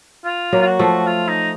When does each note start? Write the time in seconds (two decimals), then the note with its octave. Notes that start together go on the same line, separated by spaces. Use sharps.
0.24 F4
0.53 F#3 A#3
0.62 F4
0.66 F#4
0.79 F3 A3
1.07 F4
1.28 D#4